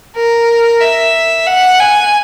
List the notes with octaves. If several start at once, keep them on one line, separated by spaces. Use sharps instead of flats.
A#4
E5
F#5
G#5